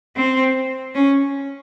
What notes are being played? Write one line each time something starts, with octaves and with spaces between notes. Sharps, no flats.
C4
C#4